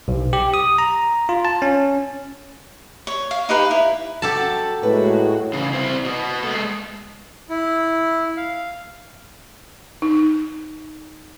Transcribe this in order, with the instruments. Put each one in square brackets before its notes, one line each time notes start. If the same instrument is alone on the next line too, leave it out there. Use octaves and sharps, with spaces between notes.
[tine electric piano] B1
G4
D#6
A#5
F4
A5
C#4
[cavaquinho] C#5
F5
D#4 G4 B4 F5
E4
[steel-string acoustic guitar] F#3 F#4 [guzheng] G4 A4 A5
[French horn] A2 [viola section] G#3 A#3 F#4 [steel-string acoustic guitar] B4
[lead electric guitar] C#3 E3
C4 E4
B2 B3
G#3 A4
[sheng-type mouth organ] E4
F5
[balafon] D#4